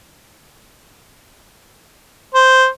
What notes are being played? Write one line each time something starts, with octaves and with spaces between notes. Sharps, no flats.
C5